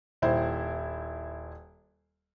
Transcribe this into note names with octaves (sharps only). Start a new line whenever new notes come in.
D#1 E4 C5